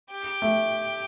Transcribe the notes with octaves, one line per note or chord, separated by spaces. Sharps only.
G4
A3